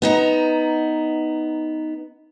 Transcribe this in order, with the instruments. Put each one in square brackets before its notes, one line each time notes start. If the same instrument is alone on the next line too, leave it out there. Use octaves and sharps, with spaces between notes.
[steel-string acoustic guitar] B3 D#4 A#5